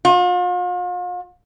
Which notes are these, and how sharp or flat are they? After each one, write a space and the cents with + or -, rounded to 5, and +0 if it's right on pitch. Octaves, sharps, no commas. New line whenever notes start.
F4 +40